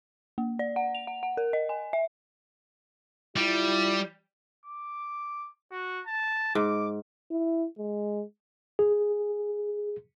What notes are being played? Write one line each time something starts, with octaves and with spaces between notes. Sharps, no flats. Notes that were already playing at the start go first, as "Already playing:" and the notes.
A#3
D5
F#5
F7
F#5
F#5
A#4
D#5
G#5
E5
G3 E4 F4
D6
F#4
A5
G#2 D6
E4
G#3
G#4